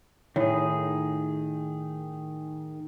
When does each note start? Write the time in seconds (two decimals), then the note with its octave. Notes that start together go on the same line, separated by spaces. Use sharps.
0.36 A2 D#3 G#4